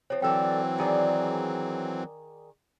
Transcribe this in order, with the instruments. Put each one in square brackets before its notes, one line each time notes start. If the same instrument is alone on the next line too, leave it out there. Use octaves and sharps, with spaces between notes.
[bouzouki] F3 C4 [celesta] C#5
[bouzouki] D3 A4 D5 [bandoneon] E3 F#3 C4 [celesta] G5 E6
[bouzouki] D#3 G#4 D5